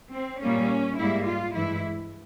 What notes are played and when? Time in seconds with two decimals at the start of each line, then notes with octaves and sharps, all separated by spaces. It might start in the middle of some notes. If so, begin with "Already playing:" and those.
0.14 C4
0.42 A#2 G3 A#3 C#4
0.98 G#2 G3 A#3 E4
1.27 F4
1.55 G2 E3 G#3 E4